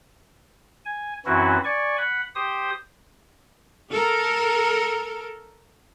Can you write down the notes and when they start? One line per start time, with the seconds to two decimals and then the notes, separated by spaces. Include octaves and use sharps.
0.85 G#5
1.26 F#2 E3 C4 C#4 E4 F#4
1.64 D5 G#5 C#6
1.98 F#5 B5
2.35 G4 C5 D#6
3.91 A4 A#4